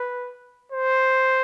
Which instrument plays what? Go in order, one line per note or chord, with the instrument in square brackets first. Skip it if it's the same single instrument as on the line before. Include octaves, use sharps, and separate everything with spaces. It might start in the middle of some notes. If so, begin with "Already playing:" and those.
Already playing: [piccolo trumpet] B4
C5